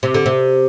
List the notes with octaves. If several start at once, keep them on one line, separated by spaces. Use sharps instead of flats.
C3
D3
C3